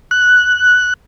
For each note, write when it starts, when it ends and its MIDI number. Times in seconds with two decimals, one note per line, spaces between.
0.11 0.94 90